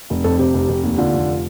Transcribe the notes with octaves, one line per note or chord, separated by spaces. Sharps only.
F1
F2 A4
C3 G4
F1
F1
D#2
D3 F4
F1